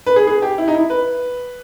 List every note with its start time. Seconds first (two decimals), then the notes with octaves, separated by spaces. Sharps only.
0.06 B4
0.16 G#4
0.27 G#4
0.42 G4
0.58 E4
0.68 D#4
0.74 E4
0.90 B4